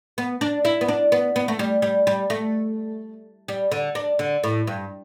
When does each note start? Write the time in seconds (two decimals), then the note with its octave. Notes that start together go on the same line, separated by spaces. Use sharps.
0.18 B3
0.41 D4
0.65 E4
0.81 B3
0.88 D4
1.12 B3
1.36 B3
1.48 A3
1.59 G3
1.82 G3
2.07 G3
2.30 A3
3.48 G3
3.72 D3
3.95 D4
4.19 D3
4.44 A2
4.67 G2